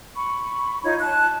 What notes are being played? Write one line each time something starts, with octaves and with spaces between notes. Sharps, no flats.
B5 C#6
D#4 F4 C#5
A5 F#6